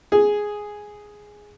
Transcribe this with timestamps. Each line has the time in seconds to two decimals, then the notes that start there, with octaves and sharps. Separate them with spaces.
0.12 G#4